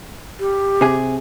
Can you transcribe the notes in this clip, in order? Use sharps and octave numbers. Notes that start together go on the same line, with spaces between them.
G4
C3 G#4